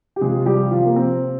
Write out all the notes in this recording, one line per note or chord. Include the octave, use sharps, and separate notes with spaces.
G4
C3 F3 G#3 G#4
F4
G3 G4
F3 F4
A#3
C4